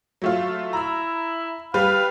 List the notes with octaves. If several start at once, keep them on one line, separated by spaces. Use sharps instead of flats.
F#3 A3 F4
E4 A#5 E6
G3 B4 F5